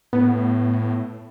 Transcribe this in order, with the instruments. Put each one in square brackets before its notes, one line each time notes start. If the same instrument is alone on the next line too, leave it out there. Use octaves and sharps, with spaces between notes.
[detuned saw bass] A2 [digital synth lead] B3